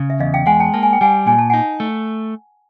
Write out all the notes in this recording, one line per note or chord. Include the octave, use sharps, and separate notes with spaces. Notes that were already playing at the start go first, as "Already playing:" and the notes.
Already playing: C#3
E5
E2 D#5 F5
F5 G5
G#3 F#5 G#5
G5 A5
A#3 A5
G#5
G5
G3 F#5 G#5
A#2 G#5
A5
D#4 F#5 G#5
A3